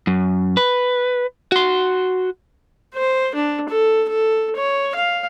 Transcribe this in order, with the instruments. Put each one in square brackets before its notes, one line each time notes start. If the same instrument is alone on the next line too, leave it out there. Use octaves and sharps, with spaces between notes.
[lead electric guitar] F#2
B4
F#4 C6
[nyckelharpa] C5
D4
A4
A4
C#5
F5